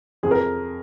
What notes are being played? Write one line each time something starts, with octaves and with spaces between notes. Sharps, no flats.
F2 G#4
A#4